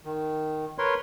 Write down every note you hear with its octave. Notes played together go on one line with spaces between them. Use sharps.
D#3
A#4 B4 C#5 C6